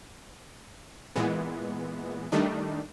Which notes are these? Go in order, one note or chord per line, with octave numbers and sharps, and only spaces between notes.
A#2 E3 G#3 B3
D#3 G3 A3 D4 D#4